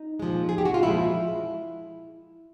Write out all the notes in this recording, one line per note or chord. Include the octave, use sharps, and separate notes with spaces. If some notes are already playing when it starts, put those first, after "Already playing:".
Already playing: D#4
A#2 F3 G#3
G#4
G4
F#4
F4
A#2 F3 G#3 E4